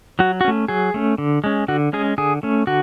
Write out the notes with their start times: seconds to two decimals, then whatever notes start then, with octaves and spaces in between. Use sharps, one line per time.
0.19 F#3 F#4
0.41 F#4
0.45 A3 C#4
0.68 F#3 G#4
0.94 A3 C#4
1.18 D3
1.44 G#3 C#4
1.68 D3 F#4
1.93 G#3 C#4 G#4
2.18 D3 G#4
2.43 A3 C#4
2.67 D3 F#4